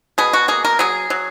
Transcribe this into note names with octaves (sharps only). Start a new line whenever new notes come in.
B2 G#4
F#4
A#3 G#4
A#4
F#3 G#4
F#3